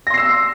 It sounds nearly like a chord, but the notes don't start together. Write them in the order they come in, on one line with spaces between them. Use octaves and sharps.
A#6 C6 C7 E6